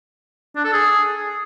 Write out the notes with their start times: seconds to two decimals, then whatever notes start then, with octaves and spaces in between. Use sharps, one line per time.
0.56 D4
0.64 A4
0.73 G#4